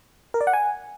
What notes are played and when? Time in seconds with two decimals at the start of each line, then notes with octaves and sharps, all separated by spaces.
0.34 A#4
0.41 D5
0.47 F#5
0.53 G#5